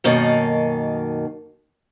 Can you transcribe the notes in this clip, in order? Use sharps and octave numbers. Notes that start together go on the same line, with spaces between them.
F#2 B2 D#3 A#3 D#4 A4